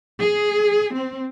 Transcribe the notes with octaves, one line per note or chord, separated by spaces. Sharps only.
G#4
C4